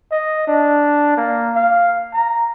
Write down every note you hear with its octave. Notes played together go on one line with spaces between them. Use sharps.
D#5
D4
A#3
F5
A#5